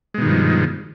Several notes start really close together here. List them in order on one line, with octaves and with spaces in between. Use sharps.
G#3 B2 D#3 G2 F3